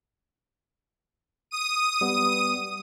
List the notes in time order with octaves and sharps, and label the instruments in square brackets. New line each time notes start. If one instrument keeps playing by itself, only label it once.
[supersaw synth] D#6 D#7
[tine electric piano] G3 B3